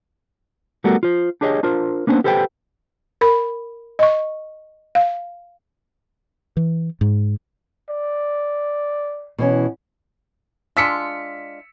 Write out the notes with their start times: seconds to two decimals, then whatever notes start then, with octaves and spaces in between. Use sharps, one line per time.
0.84 G3 A3 B3 F#4 A4 A#4
1.03 F4 C5
1.41 D4 G4 G#4 C#5 D#5
1.63 D4 F4 A#4 C5
2.07 A#3 B3 C#4 D4 G#4 C5
2.24 G4 A4 B4 C5 F#5 G5
3.21 A#4 B5
3.99 D#5 C#6
4.95 F5
6.57 E3
7.01 G#2
7.90 D5
9.38 B2 E3 C#4
10.77 G#3 D4 F4 E6 B6 C#7